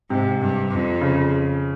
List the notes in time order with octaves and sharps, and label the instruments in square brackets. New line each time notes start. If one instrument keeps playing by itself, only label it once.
[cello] G#2 [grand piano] C3
[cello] G2
F2
[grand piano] C#3